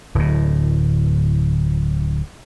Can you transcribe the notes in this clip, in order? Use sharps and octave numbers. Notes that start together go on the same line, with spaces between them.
D1 A2